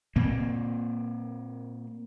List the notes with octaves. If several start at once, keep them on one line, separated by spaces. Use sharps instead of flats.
A#2 A#3 C4